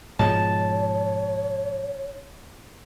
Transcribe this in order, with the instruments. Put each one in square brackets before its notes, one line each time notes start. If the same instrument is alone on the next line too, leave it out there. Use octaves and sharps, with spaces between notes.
[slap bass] G#2 B2 F3 [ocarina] C#5 [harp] A5